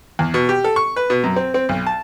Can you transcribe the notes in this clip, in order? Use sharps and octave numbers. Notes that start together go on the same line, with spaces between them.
E2
B2
G4
A4
C#6
B4
B2
F#2
C4
C4
B1
A5